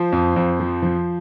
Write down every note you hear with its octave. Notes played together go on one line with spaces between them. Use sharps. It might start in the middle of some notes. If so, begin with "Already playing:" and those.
Already playing: F3 C5
F2
F2
F3
F3